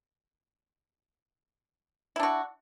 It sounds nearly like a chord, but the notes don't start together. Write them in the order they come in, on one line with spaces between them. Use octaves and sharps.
E4 D4 F#4